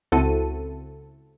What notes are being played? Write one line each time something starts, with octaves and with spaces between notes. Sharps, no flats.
C#2 C4 E4 F#4 A4 D#7